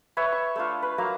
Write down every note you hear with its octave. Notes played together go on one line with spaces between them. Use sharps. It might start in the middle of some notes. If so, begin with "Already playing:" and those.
B4 C#5 E5
C#6
A3 D4 F4
B4
F#3 A#3 F5 A#5